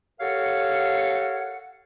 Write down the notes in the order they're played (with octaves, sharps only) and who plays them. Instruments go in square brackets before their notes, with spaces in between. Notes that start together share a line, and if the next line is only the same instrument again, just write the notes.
[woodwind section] G4 A4 A#4 C#5 F5 F#5